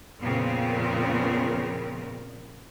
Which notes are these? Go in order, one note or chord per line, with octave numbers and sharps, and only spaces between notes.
F2 A#2 C#3 B3 C4 A#4